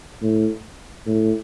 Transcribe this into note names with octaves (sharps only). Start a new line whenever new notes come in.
A2
A2